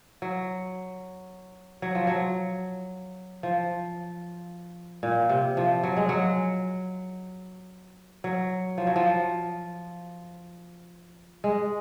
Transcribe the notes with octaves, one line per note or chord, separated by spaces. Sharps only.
F#3
F#3
F3
F#3
F3
A#2
C3
F3
F#3
G#3
F#3
F#3
F3
F#3
F3
G#3